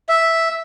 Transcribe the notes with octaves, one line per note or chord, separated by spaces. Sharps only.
E5